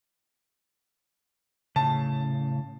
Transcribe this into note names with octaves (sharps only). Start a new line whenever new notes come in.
A2 C#3 A5